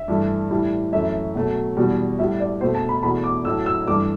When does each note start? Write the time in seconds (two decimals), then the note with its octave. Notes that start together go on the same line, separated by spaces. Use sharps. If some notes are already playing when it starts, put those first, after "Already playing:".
Already playing: E5
0.08 G2 E3 A3
0.50 A2 E3 G3
0.92 F#2 E3 A3 E5
1.35 B2 F#3 A3
1.77 E2 B2 G3
2.19 A2 G3 E5
2.40 D5
2.61 B2 A3 C5
2.75 A5
2.89 B5
3.03 E2 B2 A3 B5
3.24 D6
3.45 A2 F#3 A3 E6
3.66 E6
3.87 G2 E3 A3 D6